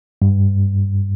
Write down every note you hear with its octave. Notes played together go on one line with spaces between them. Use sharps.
G2